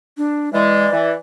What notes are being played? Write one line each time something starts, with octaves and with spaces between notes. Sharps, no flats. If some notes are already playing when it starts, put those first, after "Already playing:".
D4
E3 G#3 D5
E3